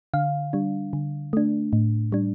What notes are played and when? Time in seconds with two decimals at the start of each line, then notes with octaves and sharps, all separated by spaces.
0.14 D3 F5
0.53 G3 D4
0.93 D3
1.33 A3 D4
1.73 A2
2.12 G3 D4